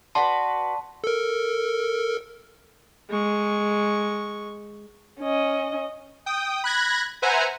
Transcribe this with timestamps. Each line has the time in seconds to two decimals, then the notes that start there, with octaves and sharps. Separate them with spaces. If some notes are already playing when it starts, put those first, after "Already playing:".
0.15 F#4 B4 D5 A5 C6
1.04 A4 A#4
3.10 G#3 C#6
5.20 C#4 D#5
6.26 G5 D#6
6.64 B5 F#6 G#6 A#6
7.22 B4 C5 E5 F#5 G#5 A#5